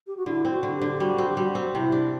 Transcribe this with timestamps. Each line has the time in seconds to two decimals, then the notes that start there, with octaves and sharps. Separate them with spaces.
0.07 G4
0.17 F#4
0.26 D3 E4
0.45 C4
0.51 F#4
0.63 D3
0.75 G4
0.82 D3
1.00 G3 F#4
1.18 C4
1.29 G4
1.37 G3 F#4
1.55 C4
1.74 C3 E4
1.92 D4